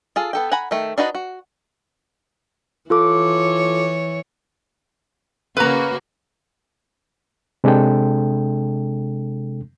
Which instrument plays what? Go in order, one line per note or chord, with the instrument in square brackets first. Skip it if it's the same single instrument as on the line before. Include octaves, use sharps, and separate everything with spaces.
[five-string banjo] F4 G#4 A4
B3 A4 G5
F#5 G#5 A#5 B5
D#3 A3
D4 D#4 F#4 B4 D#5
F#4
[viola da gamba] E3 C#5 [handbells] F4 A4 D6
[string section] C#3 A#3 F#4 [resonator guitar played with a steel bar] B4 A#5
[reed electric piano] C3 G#3 D4 A4 G5